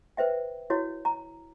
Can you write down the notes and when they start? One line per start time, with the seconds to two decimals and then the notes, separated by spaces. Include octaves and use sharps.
0.17 B4 C5 E5 G5
0.70 E4 F#4 C#5
1.05 A#5